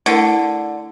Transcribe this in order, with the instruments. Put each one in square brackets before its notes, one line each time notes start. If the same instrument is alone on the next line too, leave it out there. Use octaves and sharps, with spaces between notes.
[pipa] D3 [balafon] A3 E4 A#4